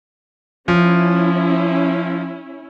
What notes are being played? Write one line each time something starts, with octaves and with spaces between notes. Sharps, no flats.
F3 C#4 E4